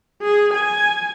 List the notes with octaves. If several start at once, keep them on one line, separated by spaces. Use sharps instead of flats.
G#4
G#5